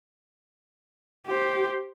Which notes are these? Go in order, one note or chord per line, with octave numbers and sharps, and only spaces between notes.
G4 C5